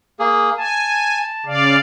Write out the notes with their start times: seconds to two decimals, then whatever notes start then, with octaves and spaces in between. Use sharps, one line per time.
0.19 A#3 G#4
0.58 G#5 A5
1.46 C#3 D5 F5